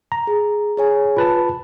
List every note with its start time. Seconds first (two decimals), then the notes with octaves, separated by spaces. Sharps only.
0.12 A#5
0.27 G#4
0.77 G#4 C#5 G#5
1.17 F4 B4 A5 B5